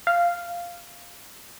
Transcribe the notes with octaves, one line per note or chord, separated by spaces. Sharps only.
F5